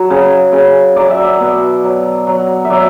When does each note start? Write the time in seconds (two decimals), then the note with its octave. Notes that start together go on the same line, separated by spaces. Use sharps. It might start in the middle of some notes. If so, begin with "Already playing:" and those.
Already playing: F#3
0.10 C#3
0.53 C#3
0.96 F#3 D5
1.10 E5
1.24 D5
1.40 B2
1.83 F#3
2.27 F#3
2.65 E5
2.70 F#3 D5